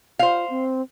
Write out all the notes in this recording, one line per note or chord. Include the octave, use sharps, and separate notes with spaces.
F4 C5 F5
C4